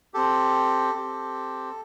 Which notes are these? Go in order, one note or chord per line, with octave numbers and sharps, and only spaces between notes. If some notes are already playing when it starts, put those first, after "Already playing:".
C4 G4 A4
C4 G4